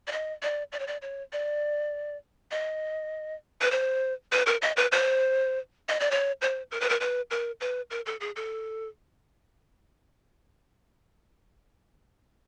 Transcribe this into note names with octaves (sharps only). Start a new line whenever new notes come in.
D5
D#5
D5
D5
C#5
D5
C#5
D5
D#5
B4
C5
B4
A#4
D#5
B4
C5
D#5
D5
C#5
C5
A#4
B4
A#4
B4
A#4
B4
A#4
A4
G#4
A4